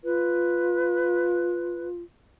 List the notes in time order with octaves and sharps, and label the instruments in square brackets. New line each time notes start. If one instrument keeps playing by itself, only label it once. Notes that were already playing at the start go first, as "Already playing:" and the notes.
[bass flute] F4 [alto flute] B4